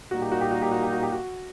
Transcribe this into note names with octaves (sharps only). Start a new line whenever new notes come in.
A#2 G3 A#3 D#4 F#4
G4
F#4
G4
F#4
G4
F#4
G4
F#4
G4
F#4